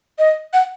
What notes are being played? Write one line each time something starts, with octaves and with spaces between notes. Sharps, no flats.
D#5
F#5